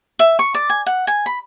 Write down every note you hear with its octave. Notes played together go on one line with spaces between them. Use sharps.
E5
C#6
D5
G#5
F#5
G#5
B5